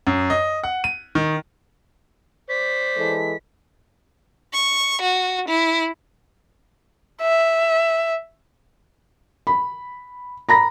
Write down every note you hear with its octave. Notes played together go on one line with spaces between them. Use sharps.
F#2
D#5
F#5
D#7
D#3
C5 D5 B6
E3 G#3 A4
C#6
F#4
E4
E5
B5
A#5 B5 A#6